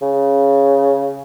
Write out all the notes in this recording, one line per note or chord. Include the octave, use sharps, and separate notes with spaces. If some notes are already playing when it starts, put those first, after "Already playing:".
C#3